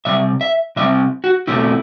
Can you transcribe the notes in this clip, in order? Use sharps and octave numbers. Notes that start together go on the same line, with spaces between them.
C3 G3 C4 E5
E5
C3 G3 C4 E5
F#4
B2 A3 C4 E4